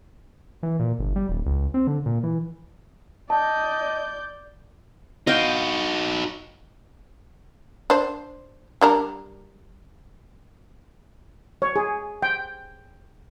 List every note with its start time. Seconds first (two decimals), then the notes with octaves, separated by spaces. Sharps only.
0.63 E3
0.80 A#2
0.99 G1
1.16 G3
1.29 D#1
1.46 C#2
1.74 C4
1.87 D3
2.06 A#2
2.23 E3
3.30 D5 D#5 A5 G6
5.27 D#4 F#4 D#5 F5 G5
7.90 D4 C5
8.81 G3 D4 A#4
11.62 C#5
11.76 G#4
12.23 G5